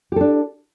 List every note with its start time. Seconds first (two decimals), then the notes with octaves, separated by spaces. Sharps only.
0.12 G4
0.16 A4
0.21 D4